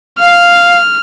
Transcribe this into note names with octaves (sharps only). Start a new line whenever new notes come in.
F5 F6